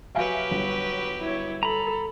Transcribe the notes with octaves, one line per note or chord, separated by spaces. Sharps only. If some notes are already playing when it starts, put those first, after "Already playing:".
F#3 G4 B4 E5 F5 G#5
G1
E4 C#5
A4 A#5 B5